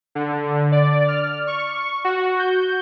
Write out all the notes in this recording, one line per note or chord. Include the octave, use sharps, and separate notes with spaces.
D3
D5
F6
C#6
F#4
G6